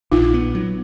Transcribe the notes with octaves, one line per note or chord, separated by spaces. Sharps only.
A#1 D#4 F4
B3
F#3